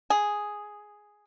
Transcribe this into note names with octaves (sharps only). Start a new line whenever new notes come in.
G#4